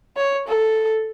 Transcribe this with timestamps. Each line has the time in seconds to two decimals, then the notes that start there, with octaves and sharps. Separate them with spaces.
0.16 C#5
0.48 A4